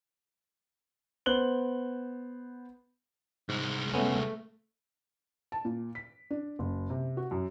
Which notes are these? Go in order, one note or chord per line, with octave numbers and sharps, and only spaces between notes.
B3 C5 F#6 F#7 G7
C2 G#2 G#3
A3 B3 C#4
A5
A#2
B6
D4
F#1
C3
F#4
F#2